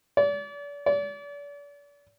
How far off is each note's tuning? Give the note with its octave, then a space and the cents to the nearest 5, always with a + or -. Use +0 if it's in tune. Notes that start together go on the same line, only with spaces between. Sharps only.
D5 -40
D5 -40